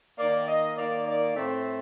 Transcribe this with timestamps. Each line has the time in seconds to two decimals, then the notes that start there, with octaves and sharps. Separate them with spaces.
0.17 D#3 A#3 D5
0.47 D#5
0.76 D#3 A#3 D5
1.05 D5
1.35 A2 A3 C4